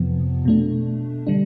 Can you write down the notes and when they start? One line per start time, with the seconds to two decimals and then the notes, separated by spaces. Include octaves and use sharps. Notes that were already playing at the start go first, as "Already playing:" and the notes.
Already playing: F2 C3 F3 B3
0.45 B2 A3 D4
1.27 D3 G3 D4